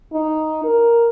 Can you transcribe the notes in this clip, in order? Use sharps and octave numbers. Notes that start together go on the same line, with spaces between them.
D#4
A#4